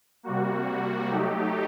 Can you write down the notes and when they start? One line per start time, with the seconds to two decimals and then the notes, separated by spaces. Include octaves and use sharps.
0.23 C3 G3 A#3 F#4
1.09 F#3 A3 D#4 G4